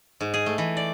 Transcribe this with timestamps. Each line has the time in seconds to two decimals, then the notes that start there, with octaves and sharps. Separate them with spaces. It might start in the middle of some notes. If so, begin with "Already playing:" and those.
0.21 G#2
0.34 G#4
0.46 A3
0.58 E3
0.77 D5